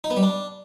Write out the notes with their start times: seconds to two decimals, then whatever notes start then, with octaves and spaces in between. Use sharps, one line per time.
0.04 D#4
0.10 B3
0.17 G3
0.23 D4